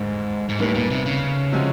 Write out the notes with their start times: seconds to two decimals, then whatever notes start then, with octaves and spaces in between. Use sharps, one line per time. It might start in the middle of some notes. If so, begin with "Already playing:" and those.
Already playing: F1 D#2 G#2 D3
0.49 G#2
0.59 D#2 A2 D#3 G3 B3
0.75 A#2
0.91 C3
1.06 C#3
1.53 C3 F3 G#3 C#4 F#4